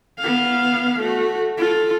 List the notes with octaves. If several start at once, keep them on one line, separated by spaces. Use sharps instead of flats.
B3 F5
A3 F#4
F4 A4